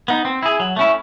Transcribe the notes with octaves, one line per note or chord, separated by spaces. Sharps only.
B3 D#4
C4
E4 G#4
F#3
A3 C#4 E4